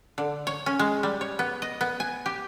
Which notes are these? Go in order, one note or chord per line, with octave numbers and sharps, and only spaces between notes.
D3
C#5
C#4
G#3
G3
C#5
B3
D#5
B3
G#5
G4